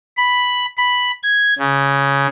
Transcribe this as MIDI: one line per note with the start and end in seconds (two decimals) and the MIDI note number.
0.17 0.66 83
0.78 1.11 83
1.23 1.54 92
1.59 2.27 49